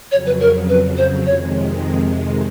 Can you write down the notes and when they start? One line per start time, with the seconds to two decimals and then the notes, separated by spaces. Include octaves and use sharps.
0.11 F2 C#3 F#3 C#5
0.26 B4
0.40 A#4
0.68 B4
0.97 C5
1.26 F2 C3 D#3 G#3 C#5